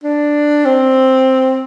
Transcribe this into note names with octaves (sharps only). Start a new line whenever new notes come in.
D4
C4